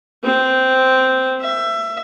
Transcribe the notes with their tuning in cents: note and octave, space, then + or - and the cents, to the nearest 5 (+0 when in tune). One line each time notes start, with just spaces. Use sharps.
C4 -10
E5 +20